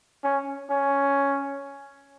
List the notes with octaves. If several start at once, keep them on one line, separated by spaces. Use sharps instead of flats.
C#4
C#4